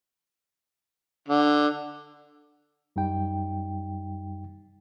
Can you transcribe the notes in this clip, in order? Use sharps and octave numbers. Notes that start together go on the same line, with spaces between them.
D3
F#2 G3 D#4 G5